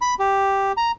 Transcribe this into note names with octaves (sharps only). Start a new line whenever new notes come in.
B5
G4
A#5